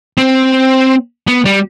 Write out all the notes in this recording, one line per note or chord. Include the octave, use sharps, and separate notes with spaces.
C4
B3
G3